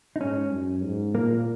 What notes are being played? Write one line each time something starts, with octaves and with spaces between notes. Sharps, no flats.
D#4
G#2 C#4
F#2
G#2
A#2 A#3